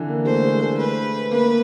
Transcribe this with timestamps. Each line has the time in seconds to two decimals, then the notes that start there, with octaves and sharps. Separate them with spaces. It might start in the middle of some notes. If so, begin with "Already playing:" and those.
Already playing: D3 E3
0.08 A#3
0.25 A3 C5
0.43 G#3
0.61 A3
0.78 B4
1.31 A#3 B4